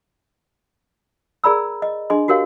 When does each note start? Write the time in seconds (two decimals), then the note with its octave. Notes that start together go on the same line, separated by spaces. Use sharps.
1.44 G#4 A#4 D5 A#5 B5 E6
1.82 D#5
2.10 D4 G#4 D#5 C6
2.28 F#4 G4 A#4 C#5 F5